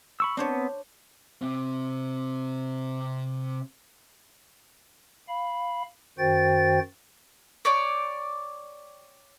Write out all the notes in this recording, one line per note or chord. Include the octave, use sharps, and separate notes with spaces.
B5 C#6 E6
B3 C4 D4 C5 C#5
C3 C4
F5 B5
F#2 D#3 F#4 C5 G5 A6
C#5 D5 G5 D6